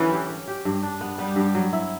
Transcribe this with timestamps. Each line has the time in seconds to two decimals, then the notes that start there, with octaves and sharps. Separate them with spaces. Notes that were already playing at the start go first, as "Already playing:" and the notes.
Already playing: D3 E3 F#3 C#4
0.11 G4
0.30 C#4
0.48 G4
0.65 G2
0.83 D4
1.01 B3
1.18 G3 B3
1.36 G2
1.55 F#3
1.73 E4